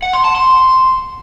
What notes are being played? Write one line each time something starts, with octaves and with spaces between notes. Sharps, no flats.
F#5
C6
A5
C6